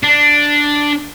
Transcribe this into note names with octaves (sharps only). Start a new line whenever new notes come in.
D4